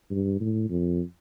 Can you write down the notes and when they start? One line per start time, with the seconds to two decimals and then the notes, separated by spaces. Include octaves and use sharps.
0.10 G2
0.40 A2
0.70 F2